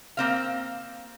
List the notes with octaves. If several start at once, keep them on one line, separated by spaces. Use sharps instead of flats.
A#3 C4 F5